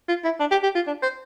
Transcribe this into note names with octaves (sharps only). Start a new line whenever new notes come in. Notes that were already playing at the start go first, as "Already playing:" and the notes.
F4
E4
D4
G4
G4
F4
D4
C5